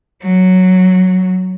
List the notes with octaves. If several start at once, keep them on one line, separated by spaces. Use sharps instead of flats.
F#3